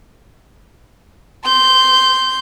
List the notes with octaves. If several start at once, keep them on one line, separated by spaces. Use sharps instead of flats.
C6 G6